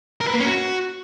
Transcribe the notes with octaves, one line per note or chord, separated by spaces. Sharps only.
A#4
B4
A#3
C#4
F#4